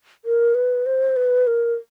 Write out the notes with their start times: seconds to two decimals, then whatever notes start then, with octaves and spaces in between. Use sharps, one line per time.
0.25 A#4
0.55 B4
0.86 C5
1.16 B4
1.47 A#4